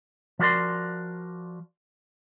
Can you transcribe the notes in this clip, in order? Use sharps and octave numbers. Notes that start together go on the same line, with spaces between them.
F3 G3 F#4 A#4 D5 C6